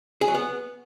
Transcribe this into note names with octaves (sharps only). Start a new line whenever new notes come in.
G#4
F#3
B3